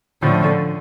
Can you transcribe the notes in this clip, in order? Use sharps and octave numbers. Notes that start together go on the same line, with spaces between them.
A2 D3 F3 A3